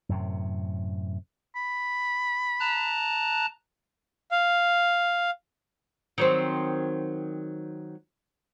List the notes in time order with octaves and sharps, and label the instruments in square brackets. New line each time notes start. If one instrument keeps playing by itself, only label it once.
[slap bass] F#2 A2 C3
[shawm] B5
[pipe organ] A5 A#5 F#6
[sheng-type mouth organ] F5
[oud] D#3 F#3 C4